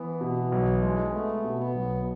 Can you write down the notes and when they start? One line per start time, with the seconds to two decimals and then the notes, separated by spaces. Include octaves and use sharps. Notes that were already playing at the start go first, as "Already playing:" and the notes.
Already playing: E3 B3
0.21 B2
0.52 B1
0.82 G#3
1.12 A3 B3
1.44 B2
1.59 B3
1.75 B1